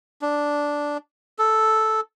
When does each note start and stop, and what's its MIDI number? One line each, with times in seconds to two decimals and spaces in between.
0.22 0.97 62
1.39 2.00 69